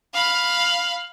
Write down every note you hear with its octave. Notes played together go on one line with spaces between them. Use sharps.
F5 B5